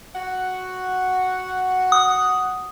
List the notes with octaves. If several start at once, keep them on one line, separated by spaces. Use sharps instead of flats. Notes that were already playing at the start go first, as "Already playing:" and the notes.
F#4 F#5
D#6